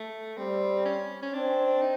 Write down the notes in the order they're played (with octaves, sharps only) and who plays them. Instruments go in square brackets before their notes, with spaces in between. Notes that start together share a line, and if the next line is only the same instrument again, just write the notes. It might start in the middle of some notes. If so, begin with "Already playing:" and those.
Already playing: [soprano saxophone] A3
[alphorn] G3 [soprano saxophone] C4
[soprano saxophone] C#4
C#4
[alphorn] C4 [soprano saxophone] D4
[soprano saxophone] D#4